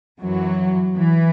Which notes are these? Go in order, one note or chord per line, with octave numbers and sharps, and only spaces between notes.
F#2 E3 F#3
E3